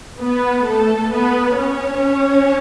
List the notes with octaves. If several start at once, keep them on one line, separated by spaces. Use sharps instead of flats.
B3 B4
A3 A4
B3 B4
C#4 C#5